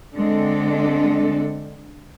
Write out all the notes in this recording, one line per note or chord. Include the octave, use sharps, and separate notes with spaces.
D3 G#3 C4 D4 A4